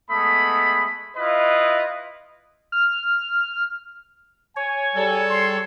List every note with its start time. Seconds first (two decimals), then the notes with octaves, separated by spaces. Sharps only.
0.10 G#3 A3 B3 B5 D#6
1.16 E4 F4 B4 D#5
2.72 F6
4.56 C#5 G#5
4.95 G3 G#4 A4
5.29 C6